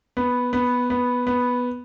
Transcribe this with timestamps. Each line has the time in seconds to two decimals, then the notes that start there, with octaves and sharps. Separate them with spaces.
0.17 B3
0.53 B3
0.90 B3
1.27 B3